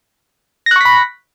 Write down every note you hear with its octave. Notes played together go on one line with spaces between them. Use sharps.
B5 C#6 F#6 A#6 B6